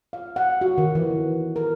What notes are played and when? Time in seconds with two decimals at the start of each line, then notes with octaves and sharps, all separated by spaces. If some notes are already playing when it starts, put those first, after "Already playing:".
0.13 F5
0.36 F#5
0.61 F#4
0.78 D#3
0.95 E3
1.56 A#4